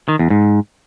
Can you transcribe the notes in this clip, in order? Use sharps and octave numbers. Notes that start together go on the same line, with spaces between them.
D#3
E2
G#2